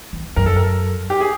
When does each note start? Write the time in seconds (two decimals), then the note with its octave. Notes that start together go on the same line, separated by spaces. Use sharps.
0.13 E2
0.36 F#2 A#4
0.46 A4
0.56 A#4
1.10 G4
1.21 G#4